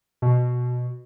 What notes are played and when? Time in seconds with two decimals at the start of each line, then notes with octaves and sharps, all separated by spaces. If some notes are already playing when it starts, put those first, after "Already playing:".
0.22 B2